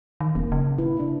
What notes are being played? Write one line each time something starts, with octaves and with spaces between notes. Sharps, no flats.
D#3
E1 A#3
C#3
C3 E4 B4
D4 E4